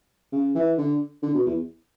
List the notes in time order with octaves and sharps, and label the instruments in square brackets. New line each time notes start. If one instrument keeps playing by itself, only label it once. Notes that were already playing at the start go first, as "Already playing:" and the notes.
[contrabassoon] C#3
E3
D3
D3
B2
E2